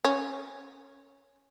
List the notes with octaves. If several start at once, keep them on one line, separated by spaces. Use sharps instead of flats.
C#4